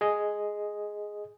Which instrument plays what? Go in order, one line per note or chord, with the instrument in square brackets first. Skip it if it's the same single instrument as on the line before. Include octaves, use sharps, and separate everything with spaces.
[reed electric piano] G#4 D#5